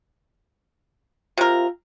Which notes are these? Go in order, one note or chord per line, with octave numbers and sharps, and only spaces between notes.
C3 F4 A#4